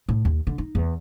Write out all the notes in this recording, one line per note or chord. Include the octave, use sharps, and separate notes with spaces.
A2
D#2
D3
D#4
E2